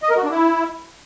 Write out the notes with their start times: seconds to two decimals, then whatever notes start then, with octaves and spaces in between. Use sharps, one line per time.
0.03 D#5
0.10 A#4
0.17 F#4
0.24 D4
0.31 E4